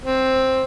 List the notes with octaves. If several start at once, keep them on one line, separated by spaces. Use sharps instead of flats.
C4